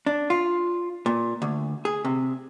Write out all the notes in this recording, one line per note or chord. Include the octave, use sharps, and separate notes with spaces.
D4
F4
A#2
D2
G#4
C3